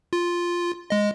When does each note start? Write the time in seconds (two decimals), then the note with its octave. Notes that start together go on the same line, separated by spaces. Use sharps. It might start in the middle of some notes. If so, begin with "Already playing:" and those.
0.13 F4
0.90 G#3 D#5